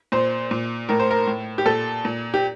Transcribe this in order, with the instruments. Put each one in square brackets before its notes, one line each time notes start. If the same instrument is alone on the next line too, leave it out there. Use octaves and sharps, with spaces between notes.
[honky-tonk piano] A#2 C5
A#2
A2 A#4
C5
A#4
A2
G4
A#2 A4
A#2
G4